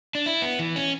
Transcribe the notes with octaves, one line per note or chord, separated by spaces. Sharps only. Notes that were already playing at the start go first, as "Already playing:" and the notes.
D4
E4
B3
E3
C#4